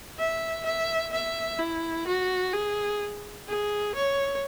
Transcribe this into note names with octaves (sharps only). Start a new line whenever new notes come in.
E5
E5
E5
E4
F#4
G#4
G#4
C#5